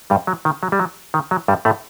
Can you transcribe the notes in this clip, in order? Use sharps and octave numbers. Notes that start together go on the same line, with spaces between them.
G2 G3
F#3
D#3
F#3
G3
F#3
D#3
F#3
G2 G3
A2 A3